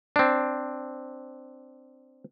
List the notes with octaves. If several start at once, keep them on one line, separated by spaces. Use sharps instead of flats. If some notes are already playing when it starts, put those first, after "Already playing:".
C4 D4